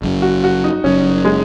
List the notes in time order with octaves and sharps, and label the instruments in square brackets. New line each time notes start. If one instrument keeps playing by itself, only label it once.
[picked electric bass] F#1 F#2 F#3
[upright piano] F#4
F#4
D#4
[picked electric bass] F#1 F#2 F#3 [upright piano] C#4
[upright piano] G#3